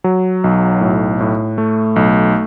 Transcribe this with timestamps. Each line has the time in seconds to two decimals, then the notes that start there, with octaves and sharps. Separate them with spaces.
0.04 F#3
0.44 B1
0.81 A2
1.20 A2
1.58 A3
1.96 B1